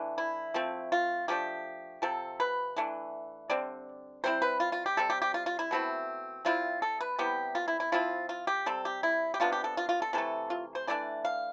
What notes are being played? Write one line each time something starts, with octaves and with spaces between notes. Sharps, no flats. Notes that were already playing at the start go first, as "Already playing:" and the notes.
Already playing: E3 A3 D4
E4
F3 A3 C4
F4
F3 A3 D4 G4
C3 F3 C4 A4
B4
E3 A3 D4
D3 G3 C4 D5
C3 G3 C4 E4 C5
B4
F4
F4
G4
C3 G3 C4 A4
G4
G4
F4
F4
E4
B2 A3 C4 E4
C3 G3 C4 E4 F4
A4
B4
C3 G3 B3 E4 G4
F4
E4
E4
F3 C4 E4 F4
F4
G4
C3 G3 C4 A4
G4
E4
G4
C3 F3 B3 D4 F4
G4
A4
F4
F4
A4
C3 E3 A3 A4
F4
C5
E3 A3 D4 D5
F5